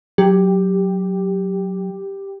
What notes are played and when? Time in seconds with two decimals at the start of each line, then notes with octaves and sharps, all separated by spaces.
0.18 F#3 G4